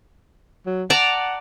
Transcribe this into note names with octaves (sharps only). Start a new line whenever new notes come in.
F#3
D5 F#5 A5 A#5